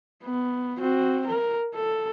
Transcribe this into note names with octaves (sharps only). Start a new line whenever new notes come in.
B3
C4 F#4
A#4
A4